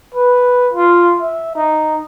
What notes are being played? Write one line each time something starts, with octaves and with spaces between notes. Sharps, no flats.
B4
F4
E5
D#4